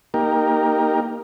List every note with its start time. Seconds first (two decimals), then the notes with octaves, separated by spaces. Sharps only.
0.14 A#3 D#4 G4 A#4